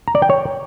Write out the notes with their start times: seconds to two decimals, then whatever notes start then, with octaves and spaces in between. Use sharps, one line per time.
0.08 A#5
0.15 D5
0.22 G5
0.30 C#5